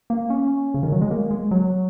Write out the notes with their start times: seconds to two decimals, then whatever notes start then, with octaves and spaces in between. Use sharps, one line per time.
0.10 A#3
0.30 C#4
0.74 C#3
0.83 D#3
0.92 F#3
1.01 G#3
1.11 A#3
1.31 G#3
1.51 F#3